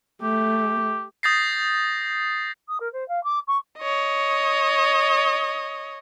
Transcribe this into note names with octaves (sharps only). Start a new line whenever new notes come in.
A3 G4
D#6 G6 A6 A#6 C7
D#6
A#4
C5
F5
D6
C#6
C#5 D#5